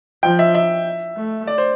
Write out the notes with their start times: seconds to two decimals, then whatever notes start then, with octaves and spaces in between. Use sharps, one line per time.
0.23 F3 G5
0.39 E5
0.55 E5
1.17 A3
1.47 D5
1.58 C5